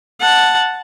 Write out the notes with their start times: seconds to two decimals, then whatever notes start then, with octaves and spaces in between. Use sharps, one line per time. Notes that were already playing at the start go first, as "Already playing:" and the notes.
0.21 F#5 A5